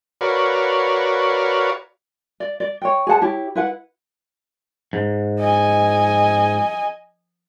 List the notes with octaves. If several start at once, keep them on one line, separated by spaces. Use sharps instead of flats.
F#4 A#4 B4 C#5 D5 F5
D5
D5
C#5 G5
G#4 C5 F#5 A5
E4 G4 C#5
E4 B4 F#5
G#2
D#5 G#5